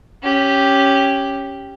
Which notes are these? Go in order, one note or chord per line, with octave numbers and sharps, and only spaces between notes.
C#4 G4